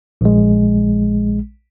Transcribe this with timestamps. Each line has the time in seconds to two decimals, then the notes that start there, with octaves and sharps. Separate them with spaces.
0.21 A#1 G#3